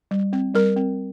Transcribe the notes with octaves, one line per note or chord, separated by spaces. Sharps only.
G3
C4
G3 A#4
C4